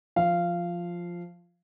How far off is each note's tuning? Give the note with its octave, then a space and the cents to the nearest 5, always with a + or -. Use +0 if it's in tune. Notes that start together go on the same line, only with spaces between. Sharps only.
F3 +0 F5 -15